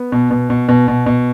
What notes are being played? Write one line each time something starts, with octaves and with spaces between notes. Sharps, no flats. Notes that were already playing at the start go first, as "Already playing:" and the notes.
Already playing: B3
B2
B2
B2
B2
B2
B2